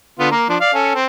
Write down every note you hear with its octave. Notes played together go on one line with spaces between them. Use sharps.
D3 B3 F4
A#3 A#4
F3 D4
D5 F5
C#4 A4
C4